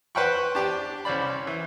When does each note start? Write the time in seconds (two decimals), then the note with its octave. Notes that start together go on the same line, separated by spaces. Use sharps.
0.15 B4 C5 F#5 G5 B5 C#6
0.55 D4 G4 A5
1.05 C2 C#4 C5 D5 B5
1.47 E3